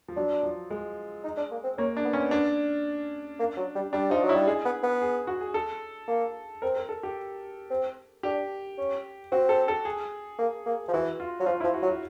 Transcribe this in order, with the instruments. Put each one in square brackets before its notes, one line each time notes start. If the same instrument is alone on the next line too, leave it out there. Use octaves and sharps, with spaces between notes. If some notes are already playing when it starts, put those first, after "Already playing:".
[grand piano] F3
[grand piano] F#3 [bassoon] D4
[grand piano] F3
G#3
[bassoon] D#4
D4
A#3
C4
[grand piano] A#3 [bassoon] C#4
[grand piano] D4
[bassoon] B3
[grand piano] C#4
D4
[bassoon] A#3
F#3
G3
[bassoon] G3 [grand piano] D4
[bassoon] F3 [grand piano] D#4
[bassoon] F#3
[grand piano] E4
[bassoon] G3
[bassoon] G#3 [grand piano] G#4
[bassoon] B3
B3
[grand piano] G#4
F#4
G#4
A4
[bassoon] A#3
[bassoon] C4 [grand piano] A#4
[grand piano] A#4
A4
G4
[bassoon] C4
[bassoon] D4 [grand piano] G4
[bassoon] C#4
[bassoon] C4 [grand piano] F#4
[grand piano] A4
A4
G#4
[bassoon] A#3
A#3
F3
[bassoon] E3 [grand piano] F#4
[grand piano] F4
[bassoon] F#3
[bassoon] F3 [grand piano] F4
[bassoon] F3 [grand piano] E4
[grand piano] F#4
[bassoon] F#3
[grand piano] F#4